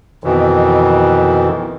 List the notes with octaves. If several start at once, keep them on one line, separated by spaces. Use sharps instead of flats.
F2 B2 D#3 E3